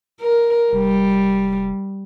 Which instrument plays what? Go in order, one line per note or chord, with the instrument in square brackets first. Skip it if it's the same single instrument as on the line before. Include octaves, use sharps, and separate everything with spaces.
[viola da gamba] A#4
[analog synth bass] F1 [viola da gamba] G3